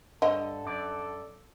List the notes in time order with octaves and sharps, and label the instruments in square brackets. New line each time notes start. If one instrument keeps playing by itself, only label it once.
[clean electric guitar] G2 [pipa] D3 [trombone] A4 [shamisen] D#5
[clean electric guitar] F#2 D5